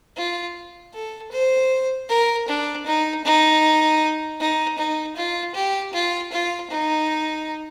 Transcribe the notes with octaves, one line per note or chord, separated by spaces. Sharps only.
F4
A4
C5
A#4
D4
D#4
D#4
D#4
D#4
F4
G4
F4
F4
D#4